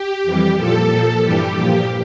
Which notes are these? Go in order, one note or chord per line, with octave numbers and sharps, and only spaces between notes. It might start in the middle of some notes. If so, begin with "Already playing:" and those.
Already playing: G4
F2 E3 G3
A#2 F3 A4
A#2 F3
G2 E3 G3 G4
A#2 F3